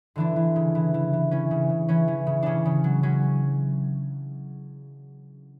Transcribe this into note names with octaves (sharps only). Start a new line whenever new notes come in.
D3 E3 D4
E3
C#3
E3
E3
E3
E3 C#4
C#3
C#3
E3 C#4
E3
C#3
C#3 C#4 D4
C#3
F#3
F#3 C#4